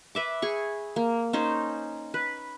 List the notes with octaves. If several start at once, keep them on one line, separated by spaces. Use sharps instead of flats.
B4 E5 D6
G#4 C#6
A#3
C#4 D#4 C5
B4